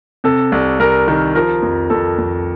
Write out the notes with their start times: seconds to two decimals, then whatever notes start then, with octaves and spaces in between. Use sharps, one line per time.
0.24 C3 A4
0.52 C2
0.79 C2 A#4
1.08 D#3
1.35 F3 A#4
1.63 F2
1.90 F2 A4
2.18 F2